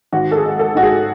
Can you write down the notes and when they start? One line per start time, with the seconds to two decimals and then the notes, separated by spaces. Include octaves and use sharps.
0.12 G#1 F#4
0.31 A4
0.36 G#4
0.43 G#3
0.59 A4
0.75 G#2 F#4
0.83 G#4